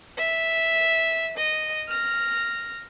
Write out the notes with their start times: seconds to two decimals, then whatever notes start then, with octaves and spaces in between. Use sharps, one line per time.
0.18 E5
1.37 D#5
1.88 F6 A#6